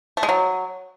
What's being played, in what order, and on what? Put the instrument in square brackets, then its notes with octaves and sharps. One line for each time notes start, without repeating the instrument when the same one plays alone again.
[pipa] A3
G#3
F#3